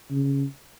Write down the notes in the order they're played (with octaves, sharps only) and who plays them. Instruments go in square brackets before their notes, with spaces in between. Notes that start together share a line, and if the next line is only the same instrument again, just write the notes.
[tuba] C#3